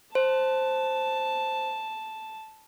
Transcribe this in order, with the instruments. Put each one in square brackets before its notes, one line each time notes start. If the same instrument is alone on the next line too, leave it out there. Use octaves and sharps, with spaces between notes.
[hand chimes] C5 [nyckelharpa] A5